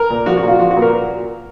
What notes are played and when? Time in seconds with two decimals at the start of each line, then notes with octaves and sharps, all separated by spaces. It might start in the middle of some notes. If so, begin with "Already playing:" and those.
Already playing: A#4
0.10 A#2
0.26 F3 F#4
0.37 F#4
0.43 A#2
0.48 F4
0.59 F3 F#4
0.71 F#4
0.76 A#2
0.82 A#4